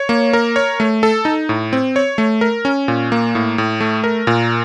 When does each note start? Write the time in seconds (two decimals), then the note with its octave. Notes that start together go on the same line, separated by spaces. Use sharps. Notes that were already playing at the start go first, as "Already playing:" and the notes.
Already playing: C#5
0.09 A#3
0.33 A#4
0.56 C#5
0.80 A3
1.03 A4
1.25 D#4
1.49 A2
1.73 C4
1.96 C#5
2.18 A3
2.41 A#4
2.65 C#4
2.88 A#2
3.12 A#3
3.35 A2
3.58 A2
3.80 A3
4.04 A#4
4.27 A#2